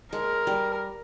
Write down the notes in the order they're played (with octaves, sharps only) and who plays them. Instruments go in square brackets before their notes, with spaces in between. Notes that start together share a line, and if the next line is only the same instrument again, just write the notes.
[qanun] G#3 [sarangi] A#4
[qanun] G3